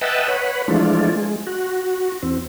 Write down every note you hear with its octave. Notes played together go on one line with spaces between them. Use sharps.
B4 D#5 E5 F#5 G5 A5
B4 C#5 F#5 B5
E3 F3 G#3 A3 D4 F4
G#3
F#4
E2 C4